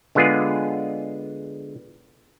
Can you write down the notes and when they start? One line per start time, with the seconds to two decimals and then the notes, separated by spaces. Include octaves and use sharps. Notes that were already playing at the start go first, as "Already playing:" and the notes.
0.15 D3 G#3 B3 F4 G#4